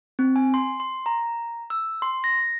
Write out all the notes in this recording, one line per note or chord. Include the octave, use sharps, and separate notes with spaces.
C4
G#5
C6
C6
A#5
E6
C6
A#6